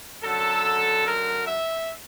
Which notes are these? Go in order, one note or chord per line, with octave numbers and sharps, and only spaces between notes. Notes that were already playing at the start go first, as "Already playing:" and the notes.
F#2 D3 F#3 A4
A#4
E5